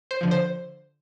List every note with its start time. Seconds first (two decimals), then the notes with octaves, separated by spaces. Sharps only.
0.11 C5
0.21 D3 F3
0.31 C5